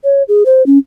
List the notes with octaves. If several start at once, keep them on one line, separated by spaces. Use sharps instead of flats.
C#5
G#4
C5
C#4